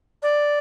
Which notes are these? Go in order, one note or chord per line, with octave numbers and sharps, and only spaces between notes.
D5